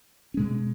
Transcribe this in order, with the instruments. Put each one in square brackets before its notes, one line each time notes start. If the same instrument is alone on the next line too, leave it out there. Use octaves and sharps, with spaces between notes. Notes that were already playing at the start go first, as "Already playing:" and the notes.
[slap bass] B2 G#3 C#4